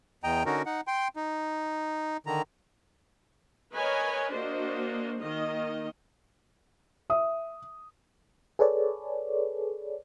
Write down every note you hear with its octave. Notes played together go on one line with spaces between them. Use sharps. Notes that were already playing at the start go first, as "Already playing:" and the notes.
E2 D#5 G5 A#5
D3 C#4 D#4 F#4 A#4
D#4 F#5
G5 C6
D#4
D3 D#3 A#5
A#4 B4 C#5 D#5 G#5
A#3 D4 F#4 C5 D#5
D#3 A#3 D#5
E5 D#6
G#4 A4 B4 C#5 D5